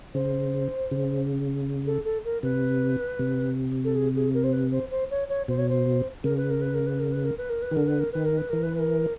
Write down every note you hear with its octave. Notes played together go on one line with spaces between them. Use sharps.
C#3 C5
C#3
A4
A4
A#4
C3 B4
C3
A4
G#4
G#4
A#4
C5
B4
C5
C5
C#5
C#5
B2 C5
C#5
C5
C#3 A#4
B4
A#4
B4
A#4
B4
A#4
B4
A#4
B4
A#4
B4
D#3
D3 A#4
B4
A#4
D#3 B4
A#4
B4
E3 A#4
B4
B4
A#4